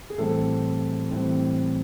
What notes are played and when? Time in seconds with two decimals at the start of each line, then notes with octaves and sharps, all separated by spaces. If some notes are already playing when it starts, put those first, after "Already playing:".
0.10 G#4
0.18 A2 E3 G3 C4 A4
1.11 A2 E3 G3 C4